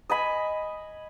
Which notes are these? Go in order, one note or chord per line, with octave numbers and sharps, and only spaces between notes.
D#5 G#5 B5